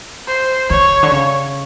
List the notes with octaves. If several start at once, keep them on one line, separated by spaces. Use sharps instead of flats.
C5
C#3 C#5
D3
C#3